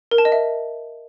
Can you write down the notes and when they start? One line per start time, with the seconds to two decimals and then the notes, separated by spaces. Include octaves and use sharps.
0.11 A#4
0.18 A5
0.25 D#5
0.32 E5